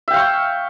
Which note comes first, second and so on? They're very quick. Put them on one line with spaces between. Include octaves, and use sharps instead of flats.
E5 G5 F5 C#6